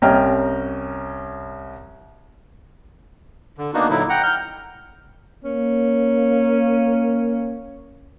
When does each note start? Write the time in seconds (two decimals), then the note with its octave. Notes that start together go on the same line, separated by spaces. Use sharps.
0.02 C2 C#4 D#5 G5 A#5 F6
3.58 D3
3.74 A#3 B3 D4 D#4 F#4
3.90 A#2 D3 F#3 D#4 E4
4.10 F#5 G5 A#5
4.23 F6 G6
5.44 A#3 C#4